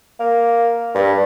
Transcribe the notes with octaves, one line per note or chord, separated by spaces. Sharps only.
A#3
G2